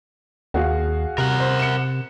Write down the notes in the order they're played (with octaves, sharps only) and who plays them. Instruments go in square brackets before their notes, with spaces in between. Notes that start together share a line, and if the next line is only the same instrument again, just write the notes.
[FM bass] D#2 [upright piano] F#4 G#4 F5
[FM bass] C3 [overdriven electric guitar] A#4 F#5
[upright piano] C5
C#7 E7